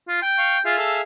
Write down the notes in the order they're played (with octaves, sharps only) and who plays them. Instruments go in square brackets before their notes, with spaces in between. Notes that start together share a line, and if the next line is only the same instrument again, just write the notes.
[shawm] F4
G5
[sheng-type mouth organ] F5 C#6
[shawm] F4 [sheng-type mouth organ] G#4 E5 F5
[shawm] A4